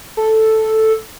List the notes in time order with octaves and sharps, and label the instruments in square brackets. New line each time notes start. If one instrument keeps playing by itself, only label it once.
[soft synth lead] A4